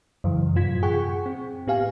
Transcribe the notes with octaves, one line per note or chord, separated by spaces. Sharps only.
F#2 C#3 E3
F#2 A2 C3 F4 G#6 B6
G#4 F#5 G5 C#6
C4
A2 B3 G4 F5 G#5